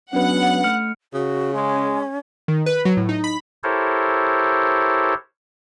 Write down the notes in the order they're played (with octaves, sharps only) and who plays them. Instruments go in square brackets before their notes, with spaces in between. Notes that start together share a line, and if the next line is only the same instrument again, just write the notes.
[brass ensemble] F#3 G#3 B3 [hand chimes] C#4 D4 B4 [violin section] F#5
[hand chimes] A3 F6 C#7
[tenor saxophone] C#3 [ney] F#4
[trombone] G#3 [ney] C#4
[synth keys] D#3
B4
F#3
A2
D#4
B5
[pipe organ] E4 G4 A4 A#4 C5 C#5